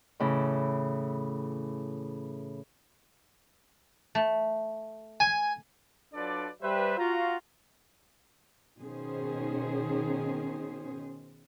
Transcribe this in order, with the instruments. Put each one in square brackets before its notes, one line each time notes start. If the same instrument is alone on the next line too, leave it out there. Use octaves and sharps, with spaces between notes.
[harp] A2 C#3 E3
[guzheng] A3
[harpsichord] G#5
[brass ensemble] F#3 D4 F4 A4 B4 D5
G3 B4 C5 E5
F4 F#4 A#5
[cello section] B2 D#3 C#4 G#4 C5